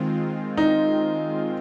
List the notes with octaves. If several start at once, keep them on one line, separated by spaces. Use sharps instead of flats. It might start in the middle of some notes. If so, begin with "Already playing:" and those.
Already playing: D#3 G#3 C4 F4
D#4